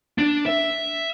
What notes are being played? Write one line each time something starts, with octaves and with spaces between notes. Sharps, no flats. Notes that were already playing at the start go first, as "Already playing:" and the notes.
D4
E5